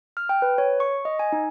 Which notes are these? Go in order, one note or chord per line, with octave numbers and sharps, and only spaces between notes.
F6
G5
B4
C#5
C#6
D#5
G#5
D#4